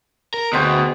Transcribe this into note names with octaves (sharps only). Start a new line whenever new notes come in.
A#4
D2 B2 G#4 C5 G5